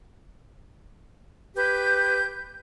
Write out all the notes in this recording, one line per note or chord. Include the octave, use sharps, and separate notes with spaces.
G4 B4 G6